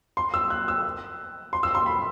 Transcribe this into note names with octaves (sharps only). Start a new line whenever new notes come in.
C6
E6
F#6
E6
C6
E6
C6
B5